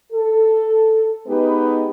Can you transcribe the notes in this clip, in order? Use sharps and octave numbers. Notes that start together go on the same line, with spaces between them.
A4
G#3 B3 D#4 G4 B4